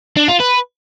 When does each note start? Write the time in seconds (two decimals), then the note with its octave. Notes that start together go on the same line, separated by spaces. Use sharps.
0.16 D4
0.28 F4
0.40 B4